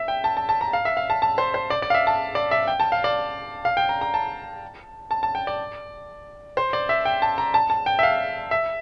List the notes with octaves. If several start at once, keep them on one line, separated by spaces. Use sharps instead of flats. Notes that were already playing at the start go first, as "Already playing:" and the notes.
Already playing: E5
G5
A5
A5
A5
A#5
F5
E5
F5
A5
A5
C5
C5
D5
D5
F5
E5
A5
D5
E5
G5
A5
F5
D5
F5
G5
A#5
A#5
A5
A5
A5
G5
D5
C5
D5
E5
G5
A5
A#5
A5
A5
G5
E5
F5
E5